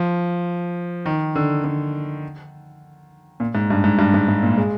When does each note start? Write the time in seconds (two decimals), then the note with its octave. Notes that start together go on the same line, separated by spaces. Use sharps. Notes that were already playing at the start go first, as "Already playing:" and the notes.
Already playing: F3
1.06 D#3
1.35 D3
1.64 D3
3.40 A#2
3.55 G#2
3.70 G2
3.84 G#2
3.99 G2
4.14 G#2
4.28 G#2
4.43 A#2
4.58 G#3